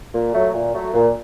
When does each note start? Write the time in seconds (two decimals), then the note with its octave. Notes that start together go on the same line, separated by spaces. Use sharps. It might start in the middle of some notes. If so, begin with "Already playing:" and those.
0.14 A#2
0.34 F#3 A3
0.54 A#2
0.74 F#3 A3
0.94 A#2